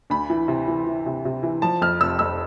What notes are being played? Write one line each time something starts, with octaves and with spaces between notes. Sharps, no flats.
D2 B5
E3
C3
E3
E3
C3
C3
E3
F3 A5
F2 F6
F1 E6
F2 E6